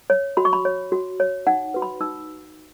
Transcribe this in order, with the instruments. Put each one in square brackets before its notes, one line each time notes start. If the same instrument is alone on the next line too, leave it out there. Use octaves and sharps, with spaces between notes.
[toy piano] C#5
F#4 B5
C#6
B5
C#5
F#4
C#5
D#4 F#5
F#4 B4
B5
D#4 E6